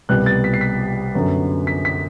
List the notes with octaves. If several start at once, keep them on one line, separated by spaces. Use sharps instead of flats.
C2 B2 G3 B3 F#6
A6
B6
C7
B6
F#2 D3 F#3 B3
B6
B6